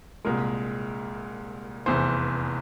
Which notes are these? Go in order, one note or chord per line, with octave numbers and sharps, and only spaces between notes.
C2 A#2 G#3 A#4
F1 E2 E3 C5